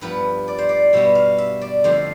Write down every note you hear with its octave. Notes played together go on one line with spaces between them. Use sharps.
G2 F3 B3 B4
D5
C5
D5
B2 G3 B3 E5
F5
E5
D5
F2 D3 A3 C5